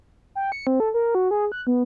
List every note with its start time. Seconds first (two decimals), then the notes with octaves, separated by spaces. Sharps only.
0.35 G5
0.52 C#7
0.67 C4
0.80 A4
0.94 A#4
1.15 F#4
1.31 G#4
1.52 F#6
1.67 B3